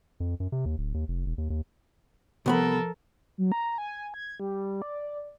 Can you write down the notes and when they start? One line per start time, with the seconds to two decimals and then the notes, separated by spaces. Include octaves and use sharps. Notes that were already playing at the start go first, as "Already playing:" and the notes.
0.20 F2
0.40 F#2
0.52 C3
0.65 D#2
0.78 D1
0.94 D#2
1.08 F1
1.26 E1
1.38 D#2
1.50 D#2
2.46 C2 F3 B3 A4 A#4 B5
3.38 F#3
3.52 A#5
3.78 G#5
4.14 G#6
4.40 G3
4.82 D5